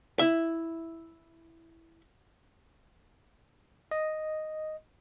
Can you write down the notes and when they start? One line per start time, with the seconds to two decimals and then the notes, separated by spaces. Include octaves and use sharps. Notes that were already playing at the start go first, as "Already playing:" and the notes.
0.19 E4 E5
3.91 D#5